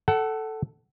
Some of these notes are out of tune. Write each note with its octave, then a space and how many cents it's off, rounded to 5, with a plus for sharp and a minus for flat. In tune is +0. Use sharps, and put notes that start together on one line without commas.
A4 +0 F#5 +25